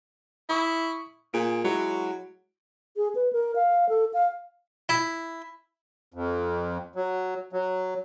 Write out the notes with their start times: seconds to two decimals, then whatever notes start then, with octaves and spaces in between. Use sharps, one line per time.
0.49 E4 C#6 D#6
1.34 A#2 G#4 D7
1.64 F#3 G#3 E4 F#4
2.97 G#4
3.15 B4
3.33 A#4
3.55 F5
3.89 A4
4.14 F5
4.89 E4
6.14 F2
6.96 F#3
7.53 F#3